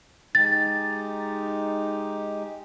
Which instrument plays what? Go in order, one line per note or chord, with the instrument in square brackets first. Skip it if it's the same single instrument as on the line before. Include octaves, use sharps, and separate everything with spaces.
[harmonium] G#3 D#4 G4 [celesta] A6